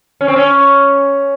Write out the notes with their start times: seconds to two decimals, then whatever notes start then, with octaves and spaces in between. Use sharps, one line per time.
0.21 C#4
0.28 C4
0.36 C#4